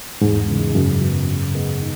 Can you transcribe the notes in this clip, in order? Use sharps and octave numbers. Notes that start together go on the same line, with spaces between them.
E2 G#2
C#3 E3 G#3
F#2 C#3
F#3 B3
C#3
G#3 B3
D#3